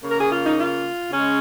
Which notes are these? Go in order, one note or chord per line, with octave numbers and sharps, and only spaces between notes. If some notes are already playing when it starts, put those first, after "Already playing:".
C#3 A#3
A#4
G#4
F4
D#4
F4
C#3 G#3 C#4